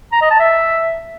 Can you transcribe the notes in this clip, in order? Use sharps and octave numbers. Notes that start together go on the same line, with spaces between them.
A#5
D#5
A5
E5